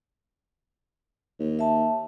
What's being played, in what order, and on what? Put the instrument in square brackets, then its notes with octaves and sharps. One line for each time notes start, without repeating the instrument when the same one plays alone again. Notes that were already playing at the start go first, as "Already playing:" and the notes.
[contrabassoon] D#2
[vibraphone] E5 A5